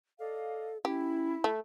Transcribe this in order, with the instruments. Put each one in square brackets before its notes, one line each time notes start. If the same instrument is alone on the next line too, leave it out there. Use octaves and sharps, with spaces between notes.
[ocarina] A4 [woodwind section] D5 D#5 F5
[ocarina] C#4 [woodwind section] E4 [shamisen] G4
[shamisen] A3